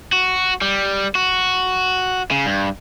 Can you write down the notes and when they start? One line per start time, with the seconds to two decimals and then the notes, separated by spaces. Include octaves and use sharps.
0.13 F#4
0.62 G3
1.15 F#4
2.31 C#3
2.46 G2